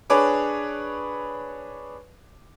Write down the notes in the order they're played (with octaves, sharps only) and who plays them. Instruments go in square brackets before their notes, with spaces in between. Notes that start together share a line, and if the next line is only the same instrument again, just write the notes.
[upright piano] D4 G#4 B4 C#5 D6